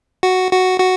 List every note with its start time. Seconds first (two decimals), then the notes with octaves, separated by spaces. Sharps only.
0.23 F#4
0.52 F#4
0.80 F#4